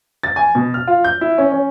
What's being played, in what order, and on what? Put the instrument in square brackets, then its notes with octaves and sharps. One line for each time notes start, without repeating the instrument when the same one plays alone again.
[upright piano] A6
G#5
B2
F6
F4
G6
E4
C#4
C#4